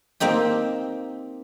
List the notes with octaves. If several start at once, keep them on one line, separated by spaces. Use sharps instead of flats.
A#3 C4 D#4 G4